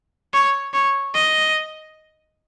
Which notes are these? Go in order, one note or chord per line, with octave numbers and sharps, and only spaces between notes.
C#5
C#5
D#5